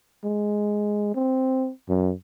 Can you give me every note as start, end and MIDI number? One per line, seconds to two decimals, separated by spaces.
0.24 1.11 56
1.15 1.70 60
1.89 2.13 42